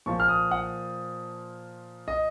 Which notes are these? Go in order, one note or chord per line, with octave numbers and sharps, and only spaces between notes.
A#2 F3 A#3 C#6
F6
D#6
F#5
D#5